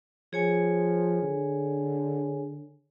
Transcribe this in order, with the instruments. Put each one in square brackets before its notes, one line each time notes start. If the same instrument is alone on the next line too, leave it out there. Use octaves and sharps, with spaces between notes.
[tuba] F3 [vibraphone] G#4 C#5 G#5
[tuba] D3